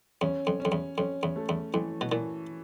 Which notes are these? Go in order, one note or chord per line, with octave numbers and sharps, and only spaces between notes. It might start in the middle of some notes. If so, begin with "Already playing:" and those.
E2 C#4
F2
C#4
F2
E2
F2 C#4
E2
A3
E2
F2 E3
B2
A#2 E3